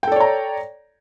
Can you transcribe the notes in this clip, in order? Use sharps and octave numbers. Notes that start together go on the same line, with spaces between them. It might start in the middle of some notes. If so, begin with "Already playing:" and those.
A4 C#5 D5 G5 A#5